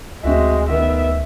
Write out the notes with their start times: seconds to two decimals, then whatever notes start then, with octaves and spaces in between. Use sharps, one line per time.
0.23 D2 G#3 C4 F#4 E5
0.69 D#3 B3 E5